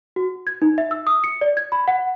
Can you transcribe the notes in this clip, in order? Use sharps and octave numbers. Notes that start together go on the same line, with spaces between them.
F#4
G#6
D#4
E5
E6
D#6
C#7
D5
G#6
B5
F#5